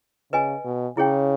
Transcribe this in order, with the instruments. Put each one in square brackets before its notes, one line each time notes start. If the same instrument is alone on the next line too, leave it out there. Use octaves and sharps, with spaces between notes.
[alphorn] C#3 [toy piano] B4 D#5 G#5
[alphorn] B2
[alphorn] C#3 [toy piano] E4 G#4 C#5 G5